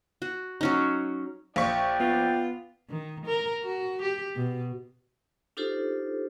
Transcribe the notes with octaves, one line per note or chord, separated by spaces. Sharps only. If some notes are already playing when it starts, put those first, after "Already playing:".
F#4
F#3 C#4 D#4
A#1 D4 D5 F5 G5 C#6 B6
B3 F4
D#3
A#4
F#4
G4
B2
D4 D#4 F4 G4 A4 C5